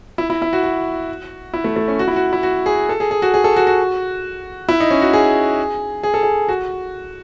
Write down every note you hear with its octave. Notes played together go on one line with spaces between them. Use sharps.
E4
E4
E4
F#4
F#4
E4
A3
A3
C#4
F#4
E4
F#4
E4
F#4
G#4
A4
G#4
G#4
F#4
G#4
A4
F#4
F#4
E4
D#4
C#4
F#4
G#4
G#4
A4
G#4
F#4